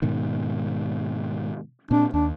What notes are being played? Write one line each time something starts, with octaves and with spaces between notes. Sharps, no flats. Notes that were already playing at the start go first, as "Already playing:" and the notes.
G#2 B2 D#3
A#2 C4 D4
D#2 D4